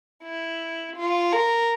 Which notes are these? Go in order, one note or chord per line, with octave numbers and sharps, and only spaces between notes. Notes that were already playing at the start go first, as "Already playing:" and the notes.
E4
F4
A#4